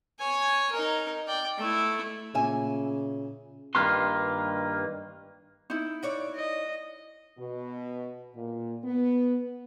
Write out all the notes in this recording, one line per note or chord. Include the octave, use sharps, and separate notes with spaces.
C#5 G#5
D#4 A#4
D5 G5
A3 E4
A#2 C#3 E5 G#5
G2 D#3 A#3 F4 B4 C6
D#4 E4
F#4 C#5 D5
D#5
B2
A#2
B3